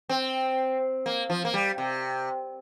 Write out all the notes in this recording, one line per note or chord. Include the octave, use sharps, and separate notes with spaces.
C4
A#3
F3
A#3
G3
C3